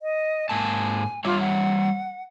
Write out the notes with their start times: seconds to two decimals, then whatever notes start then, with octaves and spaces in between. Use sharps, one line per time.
0.02 D#5
0.49 G#2 A#3 G#5 A5
1.25 G3 F4 C#5 E5 D6
1.40 F#5